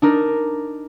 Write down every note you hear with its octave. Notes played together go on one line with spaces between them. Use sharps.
D4 D#4 A#4